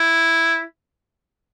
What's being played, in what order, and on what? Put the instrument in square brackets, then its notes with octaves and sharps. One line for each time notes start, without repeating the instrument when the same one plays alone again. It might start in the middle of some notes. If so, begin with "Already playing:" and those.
Already playing: [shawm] E4